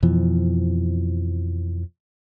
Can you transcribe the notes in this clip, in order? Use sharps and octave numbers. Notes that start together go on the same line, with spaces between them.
F2 B2 E3 F3